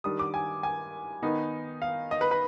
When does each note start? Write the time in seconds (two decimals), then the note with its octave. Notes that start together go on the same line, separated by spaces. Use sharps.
0.04 D#3 G3 D4 D#6
0.19 D6
0.34 G#5
0.63 G#5
1.23 D#3 B3 D#4
1.82 F5
2.11 D#5
2.21 B4
2.31 B4